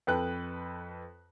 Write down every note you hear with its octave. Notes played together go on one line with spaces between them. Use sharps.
F2 A4 B4 G5 F#6